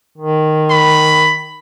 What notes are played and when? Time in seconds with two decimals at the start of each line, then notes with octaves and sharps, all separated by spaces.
0.18 D#3
0.70 B5